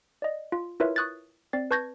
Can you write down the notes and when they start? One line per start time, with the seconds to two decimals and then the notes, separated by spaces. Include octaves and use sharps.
0.22 D5 D#5
0.52 F4
0.80 E4 F4 A#4 B4 C#5 E5
0.96 C#6 D#6 F#6 G#6 A6
1.53 C4 D5 A6 C7
1.71 B4 A5 C#6 G6 G#6 A#6